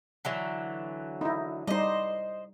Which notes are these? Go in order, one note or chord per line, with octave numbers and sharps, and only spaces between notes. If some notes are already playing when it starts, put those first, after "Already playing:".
D3 E3 F#3
D#4 E4
G3 D#4 C5 D#5